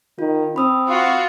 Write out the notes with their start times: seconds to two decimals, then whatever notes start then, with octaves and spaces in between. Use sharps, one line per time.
0.19 D#3 F4
0.56 C4 B5 D#6 E6
0.88 F4 F#4